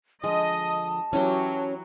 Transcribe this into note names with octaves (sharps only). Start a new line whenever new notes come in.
D3 F3 G#3 D#5 A5
E3 F#3 C#4 G4 C#5 G5